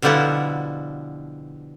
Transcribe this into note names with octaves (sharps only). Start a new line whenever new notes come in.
B2 D3 F3 G3 E4 F#4